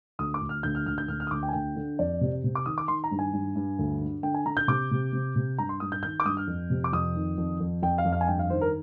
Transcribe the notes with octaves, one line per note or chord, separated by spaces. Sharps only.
D2 D#6
D6
D2
F6
D2 G6
F6
D2 F6
G6
D2 F6
F6
D#6
D2 D6
G5
G#5
D2 G5
D3
F2 D5
C3
C3
D6
D#3 D#6
D6
D#3 C6
A#5
G2
G#5
G2
G2
D2
D3
D3 G5
G#5
D3 A#5
G6
C3 D6
C3
C3
C3
G2 A#5
C6
G2 D#6
G6
D#3 G6
D6
G2 D#6
F6
F2
C3
D6
F2 D#6
D#3
F2
F2
F2 G5
F5
F2
F5
G#5
G2 G5
F5
D#3 C5
A#4